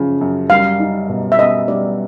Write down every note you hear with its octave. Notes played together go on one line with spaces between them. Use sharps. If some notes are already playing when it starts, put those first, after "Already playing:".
Already playing: F#2 C#3 F3
F#2
G3 F5
D#4
B2
E5
B3 D#5
G3 D5